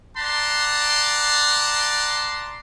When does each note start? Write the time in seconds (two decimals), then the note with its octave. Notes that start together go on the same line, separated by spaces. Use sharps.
0.18 D5 F#5 A5 A#5 C6